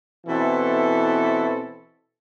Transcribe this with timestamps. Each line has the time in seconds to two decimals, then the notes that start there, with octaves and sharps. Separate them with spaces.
0.27 B2 E3 C4 E4 A4